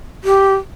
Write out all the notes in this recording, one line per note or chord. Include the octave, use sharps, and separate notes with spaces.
G4